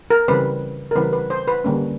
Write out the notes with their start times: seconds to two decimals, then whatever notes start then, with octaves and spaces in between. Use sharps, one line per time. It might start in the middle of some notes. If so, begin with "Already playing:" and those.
0.10 A#4
0.28 C#3 E3 G3 C4 B4
0.91 A#4
0.95 C#3 E3 G3 C4 B4
1.13 B4
1.30 C5
1.48 B4
1.64 D3 G3 A#3 C#4